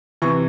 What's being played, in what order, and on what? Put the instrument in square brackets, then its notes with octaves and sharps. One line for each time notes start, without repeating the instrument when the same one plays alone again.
[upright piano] C3 E3 C#6